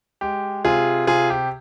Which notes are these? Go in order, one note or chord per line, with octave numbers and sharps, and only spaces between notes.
G#3 G4
C3 F4 G#4
C3 F4 G#4
G4